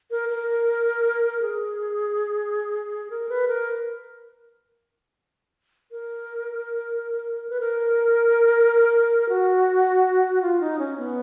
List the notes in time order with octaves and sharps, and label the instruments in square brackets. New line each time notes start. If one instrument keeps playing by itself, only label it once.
[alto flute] A#4
A#4
G#4
A#4
B4
A#4
A#4
B4
A#4
F#4
F4
D#4
C#4
B3